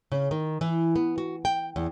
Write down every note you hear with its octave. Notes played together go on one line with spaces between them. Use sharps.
C#3
D#3
E3
B3
F#4
G5
E2